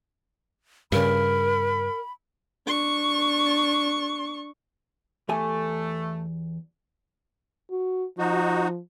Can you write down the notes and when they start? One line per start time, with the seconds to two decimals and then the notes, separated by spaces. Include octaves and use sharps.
0.92 G2 C#3 A#4 B5
2.67 D4 C#6
5.29 E2 A3 G4 G#5
7.70 F#4
8.19 F3 D#4 F#4